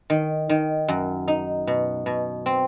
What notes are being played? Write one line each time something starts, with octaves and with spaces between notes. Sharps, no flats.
D#3
D#3
F#2
D#4
B2
B2
C4